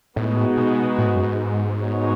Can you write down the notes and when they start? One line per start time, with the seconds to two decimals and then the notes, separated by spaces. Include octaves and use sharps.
0.16 A2 G#3 B3 D#4 F#4
0.57 B2
0.98 A2
1.07 G#2
1.15 F#2
1.23 G#2
1.80 G#3 B3 D#4 F#4 C#5